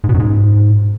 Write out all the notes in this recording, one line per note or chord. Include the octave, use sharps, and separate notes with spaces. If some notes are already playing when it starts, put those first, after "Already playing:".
G#2
B2
F#2
G#2